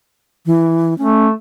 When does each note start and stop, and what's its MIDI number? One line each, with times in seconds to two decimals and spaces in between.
0.46 0.97 52
0.98 1.32 57
0.98 1.27 61